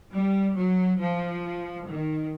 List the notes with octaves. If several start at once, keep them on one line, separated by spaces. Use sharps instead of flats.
G3
F#3
F3
D#3